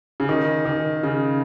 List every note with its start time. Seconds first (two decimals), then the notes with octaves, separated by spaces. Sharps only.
0.20 C#3
0.29 D#3
0.66 D#3
1.03 C#3